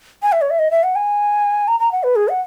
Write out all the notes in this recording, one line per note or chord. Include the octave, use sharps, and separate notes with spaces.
G#5
E5
C#5
E5
D#5
E5
F#5
G#5
A#5
A#5
F#5
B4
G#4
F#5